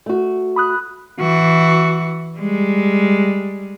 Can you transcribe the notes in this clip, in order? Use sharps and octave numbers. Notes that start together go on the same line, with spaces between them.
A3 F#4
B5 D#6 F#6
E3 F#4
G3 G#3